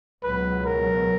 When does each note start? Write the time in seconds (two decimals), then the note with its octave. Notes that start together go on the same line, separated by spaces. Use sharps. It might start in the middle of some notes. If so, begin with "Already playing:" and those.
0.23 C#2 B2 F#3 B4
0.66 A#4